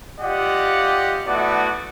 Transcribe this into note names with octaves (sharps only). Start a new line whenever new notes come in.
F4 G4 D5 D#5 F#5
A3 B3 E4 F#4 D5